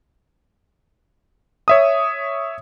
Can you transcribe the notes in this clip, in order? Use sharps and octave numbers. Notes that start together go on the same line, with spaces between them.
C#5 E5 D#6